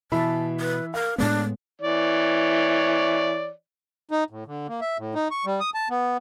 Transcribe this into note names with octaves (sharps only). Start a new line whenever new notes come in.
B2 E3 E5 A5 B5
B4
A#4 F5
A2 G#3 B3 D4
E3 C#5 D5
D#4
A2
D3
A#3
E5
A2
D#4
C#6
G3
D#6
A5
B3